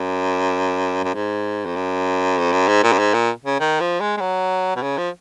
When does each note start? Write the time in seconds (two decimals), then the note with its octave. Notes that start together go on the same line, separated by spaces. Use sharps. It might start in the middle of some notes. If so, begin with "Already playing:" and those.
Already playing: F#2
1.04 F#2
1.14 G#2
1.66 F2
1.76 F#2
2.38 F2
2.52 F#2
2.68 G#2
2.83 A#2
2.92 F#2
2.99 G#2
3.14 A#2
3.44 C#3
3.60 D#3
3.80 F3
4.01 G#3
4.17 G#3
4.21 F#3
4.76 B2
4.82 C#3
4.98 F3